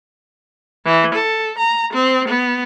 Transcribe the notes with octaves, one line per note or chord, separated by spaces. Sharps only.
E3
A4
A#5
C4
B3